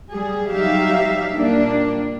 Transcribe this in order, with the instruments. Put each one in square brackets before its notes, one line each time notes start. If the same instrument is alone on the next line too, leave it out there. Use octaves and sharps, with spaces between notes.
[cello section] G3 G#4
F#3 G3 D#4 G4 E5 F5
A#2 G3 A#3 D4